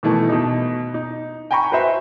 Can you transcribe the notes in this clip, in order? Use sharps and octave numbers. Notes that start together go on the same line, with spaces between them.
B2 D#3 E3 A3
B2 D#4
D#4
G5 G#5 A#5 B5 C#6
F#4 B4 C5 E5